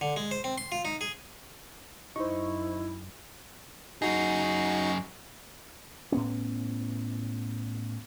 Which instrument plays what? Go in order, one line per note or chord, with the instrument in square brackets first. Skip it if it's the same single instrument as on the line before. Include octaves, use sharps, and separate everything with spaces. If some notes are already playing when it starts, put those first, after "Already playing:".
[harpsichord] D3
G#3
C5
C4
C6
F4
D#4
G#4
[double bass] F#2 [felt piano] D#4 [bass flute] E4 [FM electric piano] C5 C#6
[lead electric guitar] F#2 G#4 [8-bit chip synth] D#4 F#4
[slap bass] A2 B3 C#4